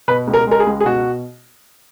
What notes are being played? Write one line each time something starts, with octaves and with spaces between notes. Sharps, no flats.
B2 B4
C#2
A#4
G#3 A#4
G#4
C#2
G#4
B2 F#4